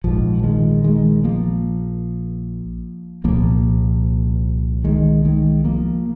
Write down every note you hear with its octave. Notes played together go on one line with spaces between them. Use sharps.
A#1 G#2 F3
D#3 G#3
D#3 G#3
F3 A#3
C2 A#2 F3 A#3
D#3 G#3
D#3 G#3
F3 A#3